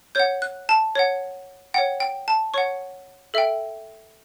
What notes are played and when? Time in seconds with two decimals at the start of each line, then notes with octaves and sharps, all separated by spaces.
0.15 C#5 F#5 G6
0.42 F#6
0.69 A5
0.95 C#5 F#5
1.74 C#5 F#5 G5
2.00 G5
2.28 A5
2.54 C#5 F#5 C#6
3.34 A4 E5 G5